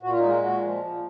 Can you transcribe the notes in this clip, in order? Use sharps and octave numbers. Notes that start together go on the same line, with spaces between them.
A#2 F#4
F4
D#4
G#3 F4
A#2 F#4
F3
A#2